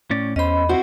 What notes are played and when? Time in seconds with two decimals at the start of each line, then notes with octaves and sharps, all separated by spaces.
0.11 A2 C#4 D5
0.36 E2 C#4 C5 D#5 B5
0.69 C4 E4 F#4 C5